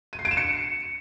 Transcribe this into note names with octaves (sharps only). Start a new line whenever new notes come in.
D#7
C7
D7
E7
C#7